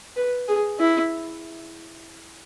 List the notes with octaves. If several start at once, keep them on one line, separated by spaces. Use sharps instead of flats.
B4
G#4
E4